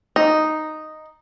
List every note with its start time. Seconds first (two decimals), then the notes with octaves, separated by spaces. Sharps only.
0.16 D#4